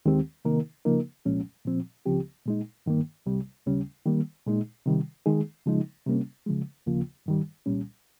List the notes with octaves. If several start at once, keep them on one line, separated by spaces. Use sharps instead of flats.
D#2 D#3 G#3 C4 G4
C3 D#3 A#3 D#4 A#4
C#3 F3 A#3 D#4 A#4
C2 A#2 F3 G#3 C#4
A#2 F3 C4
C#2 C#3 F3 C4 G4
A#2 G#3 D#4
G2 D#3 A#3
C2 C3 G3
D#2 C#3 G3 C#4
D#3 G3 A#3
A#2 G#3 D#4
C3 D#3 G3
D#3 G#3 D#4 G#4
C#3 F3 G#3 D#4
C3 G3 A#3 C#4
C#3 F3 G#3
D#2 C#3 F3 A#3 F4
G2 D#3 G3
C2 A#2 G3 C#4